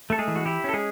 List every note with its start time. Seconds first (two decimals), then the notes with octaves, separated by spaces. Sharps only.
0.10 A3 A4
0.19 G#3 G#4
0.28 E3
0.36 F#4
0.46 E4 G4
0.64 C#4 A4
0.73 G#3 G#4